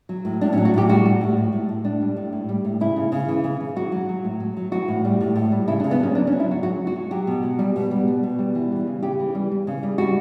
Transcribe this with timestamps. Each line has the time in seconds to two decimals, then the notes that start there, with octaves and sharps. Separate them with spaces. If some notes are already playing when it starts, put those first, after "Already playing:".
0.09 F#3
0.25 A2
0.41 A2 D4
0.53 C#4
0.57 F#3
0.65 F#4
0.74 A2 G4
0.89 G3 F#4
1.06 G3
1.21 A2
1.37 A2
1.52 A2
1.69 A2
1.84 A2 D4
2.01 G3
2.17 A2
2.33 A2
2.49 G3
2.65 A2
2.80 C#3 E4
2.96 C#3
3.12 C#3
3.28 E3
3.44 C#3
3.60 C#3
3.76 F#3 F#4
3.92 F#3
4.09 F#3
4.24 A2
4.40 F#3
4.57 F#3
4.72 E3 F#4
4.88 A2
5.05 G3
5.21 A2
5.36 A2
5.52 G3
5.68 C#3 E4
5.80 D4
5.84 C#3
5.91 B3
6.00 F#3 C#4
6.15 F#3 D4
6.27 C#4
6.32 F#3
6.40 E4
6.47 C#3 F#4
6.63 F#3 F#4
6.80 F#3
6.87 F#4
6.96 F#3
7.11 F#3 G4
7.27 B2
7.43 F#3
7.59 G3
7.76 B2
7.91 G3
8.08 G3
8.23 B2
8.39 G3
8.55 E3
8.72 G3
8.87 C#3
9.03 C#3 G4
9.19 E3
9.35 G3
9.51 G3
9.67 C#3
9.83 G3
9.98 G3 F#4